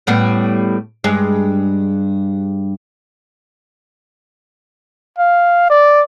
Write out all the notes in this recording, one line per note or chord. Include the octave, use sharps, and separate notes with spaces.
A2 G3 B3
G2 G#3
F5
D5